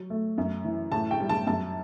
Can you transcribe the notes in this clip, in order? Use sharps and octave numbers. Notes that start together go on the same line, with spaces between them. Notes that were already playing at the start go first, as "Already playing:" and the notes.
Already playing: F#3
A3
F#2
E3
A2 A5
G5
G3
A5
F#2 A5